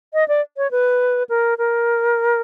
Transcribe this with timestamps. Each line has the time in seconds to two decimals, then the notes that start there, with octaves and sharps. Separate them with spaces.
0.14 D#5
0.28 D5
0.57 C#5
0.71 B4
1.29 A#4
1.58 A#4